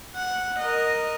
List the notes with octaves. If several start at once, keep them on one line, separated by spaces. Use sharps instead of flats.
F#5
A#4 D#5